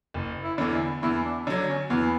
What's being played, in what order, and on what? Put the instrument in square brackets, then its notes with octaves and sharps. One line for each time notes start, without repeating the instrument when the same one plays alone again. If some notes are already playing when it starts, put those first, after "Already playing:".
[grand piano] F#1
[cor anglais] E4
[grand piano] E2 D3
[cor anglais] E4
[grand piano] E2 [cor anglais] E4
[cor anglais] D4
[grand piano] D3 F#3
[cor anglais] C#4
[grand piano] E2 [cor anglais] B3